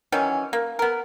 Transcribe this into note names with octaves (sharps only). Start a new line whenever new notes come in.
D#3 E3 F#3 C#4
A#3
B3 A#4